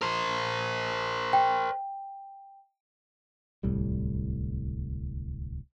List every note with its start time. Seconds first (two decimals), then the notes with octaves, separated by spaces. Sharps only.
0.02 A#4 C5
1.33 G5
3.63 D1 C2 A2 G3